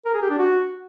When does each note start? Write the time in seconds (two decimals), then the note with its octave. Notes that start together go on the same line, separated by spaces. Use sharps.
0.05 A#4
0.13 G#4
0.22 G4
0.30 D4
0.38 F#4